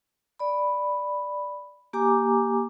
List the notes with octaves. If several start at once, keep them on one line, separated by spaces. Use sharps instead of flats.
D5 B5
A#3 G4 G#5 A#5 D6